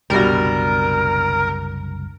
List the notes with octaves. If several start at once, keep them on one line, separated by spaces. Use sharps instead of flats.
F#1 C2 B2 G3 D4 A#4